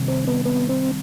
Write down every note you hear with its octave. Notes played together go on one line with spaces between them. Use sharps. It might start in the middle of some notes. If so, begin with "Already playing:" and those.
Already playing: C3 D#3 G3
C4
B3
B3
C4